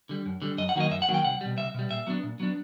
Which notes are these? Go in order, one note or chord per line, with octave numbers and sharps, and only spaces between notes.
D3 G3
F#2
D3 G3
F#2 D#5
F#5
D#3 F#3 A#3 D#5
F#2 E5
F#5
D#3 F#3 A#3
G5
C2 F#5
B2 G3
C2 E5
B2 G3
A#2 E5
F#3 B3 D4
A#2
F#3 B3 D4